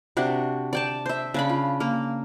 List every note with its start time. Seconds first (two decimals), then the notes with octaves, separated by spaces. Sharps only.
0.17 C3 D4 F#4
0.73 D5 G5 A5
1.06 C5 E5
1.34 C#3 D4 B5
1.49 F4
1.80 A#3